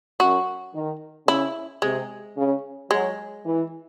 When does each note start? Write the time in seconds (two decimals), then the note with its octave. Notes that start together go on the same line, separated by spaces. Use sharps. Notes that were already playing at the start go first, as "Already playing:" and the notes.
0.19 F#2 F#4
0.74 D#3
1.27 C#3 E4
1.82 C3 G#3
2.37 C#3
2.91 F#3 G#3
3.45 E3